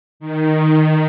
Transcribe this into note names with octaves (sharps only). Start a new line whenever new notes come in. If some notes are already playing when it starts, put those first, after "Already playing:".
D#3